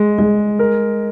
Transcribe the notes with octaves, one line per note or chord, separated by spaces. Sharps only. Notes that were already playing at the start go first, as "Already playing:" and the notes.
Already playing: G#3
G#3
A#4